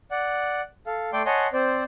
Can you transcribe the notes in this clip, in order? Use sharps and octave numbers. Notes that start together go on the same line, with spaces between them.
D5 F#5
A4 F5
A3 A4 D5 G5 C6 D6
C#5 D#5 F#5 G#5 A5 C6
C4 C5 D5